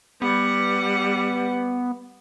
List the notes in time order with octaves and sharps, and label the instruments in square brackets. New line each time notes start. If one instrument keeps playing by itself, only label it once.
[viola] G3 F#5 [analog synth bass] B3